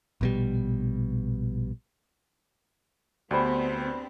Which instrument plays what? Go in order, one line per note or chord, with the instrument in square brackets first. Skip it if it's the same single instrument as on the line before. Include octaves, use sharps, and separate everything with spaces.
[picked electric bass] A#1 B2 G3
[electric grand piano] D2 C5 [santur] G3 D4 B5 [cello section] B3 C4